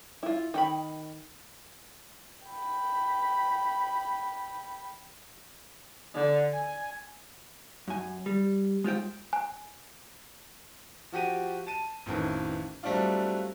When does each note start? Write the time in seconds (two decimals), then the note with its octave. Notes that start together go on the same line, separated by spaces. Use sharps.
0.23 E4 F4
0.54 D#3 G5 B5
2.47 G5 B5
6.14 D3
6.53 G#5
7.88 F#2 G#5
8.26 G3
8.84 G#3 F4 C5 G5
9.33 G#5
11.12 F3 F#4 G4 D#7
11.67 A5 D#7
12.06 A1 F2 D#3 E3
12.83 F#3 G3 A3 C4 D4 F4